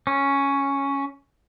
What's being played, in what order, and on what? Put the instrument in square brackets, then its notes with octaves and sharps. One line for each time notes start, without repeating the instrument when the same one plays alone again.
[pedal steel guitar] C#4